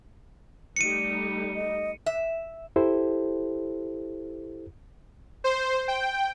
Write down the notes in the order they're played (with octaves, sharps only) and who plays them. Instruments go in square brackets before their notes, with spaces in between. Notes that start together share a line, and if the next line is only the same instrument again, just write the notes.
[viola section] G3 A3 D#4 [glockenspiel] C#7 D#7
[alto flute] D#5
[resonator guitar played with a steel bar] E5
[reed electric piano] E4 G4 A4 C5
[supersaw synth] C5
G5